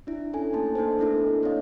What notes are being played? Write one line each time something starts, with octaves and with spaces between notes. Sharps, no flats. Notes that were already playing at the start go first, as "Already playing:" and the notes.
D4 E4
C#4 A4 G#5
A3 A#3 A5
D4 D#4 A4 C5
A3 B3 D4 E4 A4 A#4
A#3 C4 D4 C#5 D#5 F5